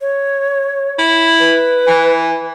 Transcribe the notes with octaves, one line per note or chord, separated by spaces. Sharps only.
C#5
E4
B4
E3